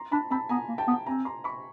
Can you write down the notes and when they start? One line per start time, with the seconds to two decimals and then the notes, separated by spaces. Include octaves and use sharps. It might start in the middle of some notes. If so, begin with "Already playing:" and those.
Already playing: A#5 C6
0.12 D4 A5 B5
0.31 C4 A5 B5
0.49 B3 G#5 A#5
0.68 A#3
0.78 G5 A5
0.87 B3
1.06 C4 G#5 A#5
1.25 A#5 C6
1.44 B5 C#6